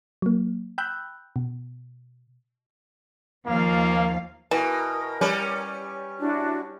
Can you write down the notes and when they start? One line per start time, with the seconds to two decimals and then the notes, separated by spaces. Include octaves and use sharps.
0.22 F#3 A#3
0.78 G5 B5 E6 F#6 G6
1.36 B2
3.46 D#2 F3 A#3 F5
4.51 B2 E3 A#4
5.21 G3 C#4 B4
6.18 D4 E4 F#4